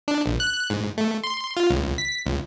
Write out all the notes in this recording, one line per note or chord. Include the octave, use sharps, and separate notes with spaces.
D4
A#1
F#6
G#2
A3
C6
F4
C#2
B6
C#2